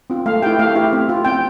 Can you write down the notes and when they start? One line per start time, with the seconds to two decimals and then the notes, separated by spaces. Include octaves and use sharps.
0.10 C4 F4
0.26 A3 F5
0.42 E4 G4 G5
0.59 A3 F5
0.75 E4 G4
0.93 C4
1.09 F4
1.25 C4 G5